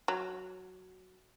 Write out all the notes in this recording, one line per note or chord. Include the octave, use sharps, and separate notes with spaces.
F#3